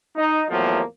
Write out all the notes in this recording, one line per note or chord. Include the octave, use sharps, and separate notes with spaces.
D#4
E2 A2 F3 F#3 A#3